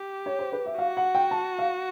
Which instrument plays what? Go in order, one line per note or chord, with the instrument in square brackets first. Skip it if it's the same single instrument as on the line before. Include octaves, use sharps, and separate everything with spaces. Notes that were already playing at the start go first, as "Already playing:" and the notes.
Already playing: [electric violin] G4
[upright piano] C#5
C5
B4
E5
[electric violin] F#4 [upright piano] F5
[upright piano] F#5
G5
A5
F5